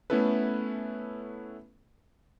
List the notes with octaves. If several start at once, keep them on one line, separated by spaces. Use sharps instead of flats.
A3 B3 C#4 E4 A4 B4